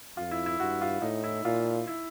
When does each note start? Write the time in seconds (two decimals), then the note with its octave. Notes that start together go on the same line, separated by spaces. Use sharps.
0.17 F2 F4
0.31 E4
0.46 E4
0.60 G2 F#4
0.81 F4
1.02 A2 D#4
1.24 E4
1.45 A#2 F4
1.87 E4